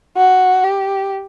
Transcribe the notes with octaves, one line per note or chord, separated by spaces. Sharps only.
F#4
G4